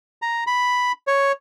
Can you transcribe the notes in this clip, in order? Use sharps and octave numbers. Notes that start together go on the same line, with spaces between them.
A#5
B5
C#5